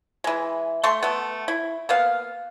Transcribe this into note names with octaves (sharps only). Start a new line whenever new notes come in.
E3 G#3
A3 C6 C#6
A3 B3
E4
A#3 B3 F5